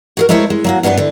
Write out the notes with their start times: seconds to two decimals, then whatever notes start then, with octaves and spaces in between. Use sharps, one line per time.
0.17 F#4 G#4 A#4
0.29 G#3 A3 E4 A#4 C5 C#5
0.50 G#3
0.64 F#3 A#3 F#4
0.83 F#2 B3 D4 G#4 B4
0.97 D3 E3